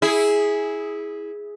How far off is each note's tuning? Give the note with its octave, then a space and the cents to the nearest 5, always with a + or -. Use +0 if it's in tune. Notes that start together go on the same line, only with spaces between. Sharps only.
E4 -15 G#4 +0